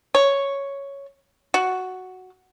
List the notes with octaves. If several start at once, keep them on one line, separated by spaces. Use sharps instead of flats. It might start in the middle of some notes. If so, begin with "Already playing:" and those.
C#5
F#4